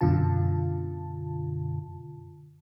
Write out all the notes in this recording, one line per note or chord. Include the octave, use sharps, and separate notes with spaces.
F#2 B2 D3 F4 A5